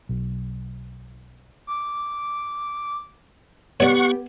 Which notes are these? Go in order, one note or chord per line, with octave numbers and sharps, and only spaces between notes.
B1
D6
B3 G4 C#5 D5 F#5 C#6